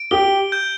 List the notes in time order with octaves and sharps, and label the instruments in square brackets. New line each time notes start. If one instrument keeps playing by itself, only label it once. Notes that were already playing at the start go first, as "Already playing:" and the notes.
Already playing: [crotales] D7
[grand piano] G4 [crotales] G7
[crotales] G6